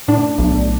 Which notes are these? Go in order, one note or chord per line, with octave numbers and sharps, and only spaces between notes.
A2 D4
B1